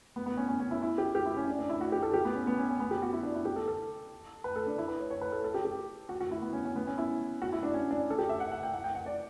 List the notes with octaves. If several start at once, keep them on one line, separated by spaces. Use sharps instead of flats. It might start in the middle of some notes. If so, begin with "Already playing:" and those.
B3
B3
C#4
C#4
C#4
E4
E4
G4
G4
E4
C#4
D4
D4
E4
F#4
G4
A4
G4
B3
C#4
B3
C#4
C#4
B3
G4
F#4
E4
D4
E4
G4
A4
A4
B4
A4
D4
E4
B4
C#5
C#5
B4
A4
A4
G4
G4
F#4
F#4
E4
B3
C#4
C#4
B3
C#4
E4
F#4
E4
D4
C#4
D4
A4
G4
E5
F#5
F#5
G5
F#5
G5
F#5
D5